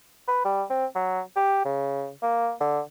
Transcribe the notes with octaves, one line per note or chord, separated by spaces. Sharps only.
B4
G3
C4
F#3
G4
C#3
A#3
D3